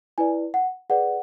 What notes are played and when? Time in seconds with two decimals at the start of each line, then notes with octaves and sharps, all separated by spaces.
0.18 E4 B4 D5 G#5
0.54 F#5
0.90 G#4 B4 D5 F#5